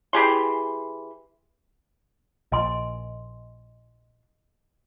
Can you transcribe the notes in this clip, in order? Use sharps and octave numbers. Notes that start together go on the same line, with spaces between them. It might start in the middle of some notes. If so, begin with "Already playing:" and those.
E3 G4 G#4 C6
A#1 D#5 G#5 C6